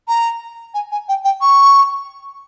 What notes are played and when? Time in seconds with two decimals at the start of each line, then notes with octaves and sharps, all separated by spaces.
0.08 A#5
0.74 G#5
0.92 G#5
1.09 G5
1.25 G5
1.42 C#6